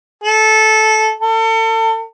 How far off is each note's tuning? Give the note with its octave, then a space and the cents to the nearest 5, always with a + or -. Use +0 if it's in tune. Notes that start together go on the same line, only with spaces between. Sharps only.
A4 -15
A4 +35